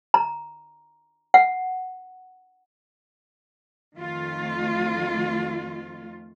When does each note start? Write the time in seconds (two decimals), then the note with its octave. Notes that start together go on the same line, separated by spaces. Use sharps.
0.14 A#5
1.34 F#5
3.97 F2 D#3 A3 F4